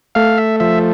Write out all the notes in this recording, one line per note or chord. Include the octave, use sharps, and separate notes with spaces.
A3 F5
E5
F3 E5